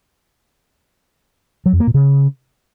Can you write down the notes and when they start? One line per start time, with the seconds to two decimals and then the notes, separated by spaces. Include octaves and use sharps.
1.66 F#3
1.73 F2
1.80 A#3
1.87 A#2
1.94 C#3